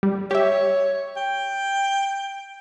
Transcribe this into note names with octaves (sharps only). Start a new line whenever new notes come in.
G3
G4 C#5 E5
G5